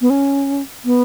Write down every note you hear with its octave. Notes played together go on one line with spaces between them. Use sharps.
B3
C#4
B3